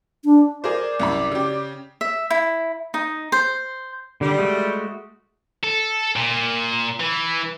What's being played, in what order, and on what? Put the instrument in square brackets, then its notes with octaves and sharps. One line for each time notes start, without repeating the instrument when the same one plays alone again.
[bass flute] D4
[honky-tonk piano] G#4 A#4 C5 [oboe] D5
[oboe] D5
[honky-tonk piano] C2 F#2 B5
C#3 G4
[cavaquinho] E5
E4
D#4
C5
[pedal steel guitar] D3 [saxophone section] G3
[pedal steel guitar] G#3 A3 F#4
[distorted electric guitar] A4
A#2
E3